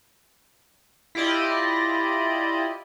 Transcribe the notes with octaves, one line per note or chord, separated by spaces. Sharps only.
E4 F4 G4 D5 D#5